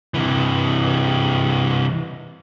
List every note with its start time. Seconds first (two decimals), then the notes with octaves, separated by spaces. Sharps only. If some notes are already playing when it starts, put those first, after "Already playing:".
0.14 C3 E3